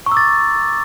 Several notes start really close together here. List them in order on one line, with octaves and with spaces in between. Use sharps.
C#6 A#5 E6 D6 A6